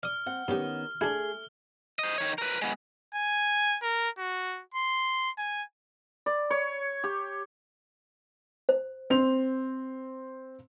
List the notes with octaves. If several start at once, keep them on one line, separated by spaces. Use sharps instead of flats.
D5 D#6 F6
C4 F#5
G2 D#3 B3 C#4 G4
A3 D4 E4 G#4 F6
C5 D#5
D#3 C#5
A#4 B4
G#3 B3
G#5
A#4
F#4
C6
G#5
D5
C#5
G4
C5
C4 F7